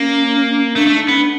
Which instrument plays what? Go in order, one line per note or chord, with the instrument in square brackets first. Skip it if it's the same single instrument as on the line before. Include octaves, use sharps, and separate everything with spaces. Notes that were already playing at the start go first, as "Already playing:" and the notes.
Already playing: [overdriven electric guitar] A#3 [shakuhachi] C#4
[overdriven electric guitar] A3 [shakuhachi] D4
[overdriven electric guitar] A3
[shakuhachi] D#4
[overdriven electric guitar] B3 [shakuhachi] C#4
[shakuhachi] D4